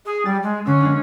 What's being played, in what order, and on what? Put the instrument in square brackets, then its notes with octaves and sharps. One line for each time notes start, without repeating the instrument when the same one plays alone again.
[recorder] G#4
[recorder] G3 [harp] A6
[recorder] G#3
[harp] D3 E6 [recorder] C#4
[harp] G#3 A#3 D4